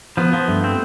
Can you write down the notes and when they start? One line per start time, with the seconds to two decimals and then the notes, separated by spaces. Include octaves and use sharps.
0.17 F3 B3
0.33 F3 B3
0.48 G2 A3
0.64 C4